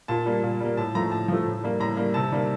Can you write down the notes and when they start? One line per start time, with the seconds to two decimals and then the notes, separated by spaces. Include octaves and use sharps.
0.08 A#2 A5
0.26 G3 A#3
0.43 A#2
0.61 G3 A#3
0.77 A2 A5
0.95 F3 A3 A#5
1.12 A2 A5
1.28 F3 A3
1.45 A2
1.64 G3 A#3
1.80 A2 A#5
1.97 G3 A#3
2.14 C3 A5
2.32 D#3 G3 A#3